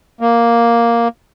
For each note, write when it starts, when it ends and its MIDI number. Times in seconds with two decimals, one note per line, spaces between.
0.21 1.08 58